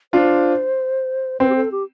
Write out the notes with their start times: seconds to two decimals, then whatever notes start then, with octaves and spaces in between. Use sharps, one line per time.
0.13 D4 F4 C5
1.40 C4 B4
1.50 G4
1.56 A4
1.72 G4